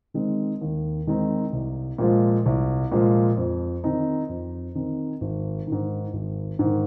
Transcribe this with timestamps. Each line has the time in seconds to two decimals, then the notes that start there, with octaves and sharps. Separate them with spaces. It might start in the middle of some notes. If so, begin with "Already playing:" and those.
0.14 D#3 G#3 C4 D#4
0.61 D#2
1.07 D#3 G#3 C4 D#4
1.53 C2
1.98 A#2 F3 G#3
2.46 C2
2.92 A#2 F3 G#3
3.37 F2
3.84 D#3 C4 D#4
4.29 F2
4.75 D#3 C4 D#4
5.21 G#1
5.67 G#2 D#3
6.13 G#1
6.59 G#2 D#3